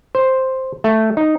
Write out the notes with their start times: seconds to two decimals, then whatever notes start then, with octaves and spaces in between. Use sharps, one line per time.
0.15 C5
0.84 A3
1.17 D#4